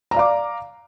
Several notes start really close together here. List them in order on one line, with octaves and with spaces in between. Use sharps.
A#5 D5 F5 D6